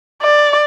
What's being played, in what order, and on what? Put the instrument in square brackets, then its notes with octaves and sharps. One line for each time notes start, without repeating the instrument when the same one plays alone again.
[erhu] D5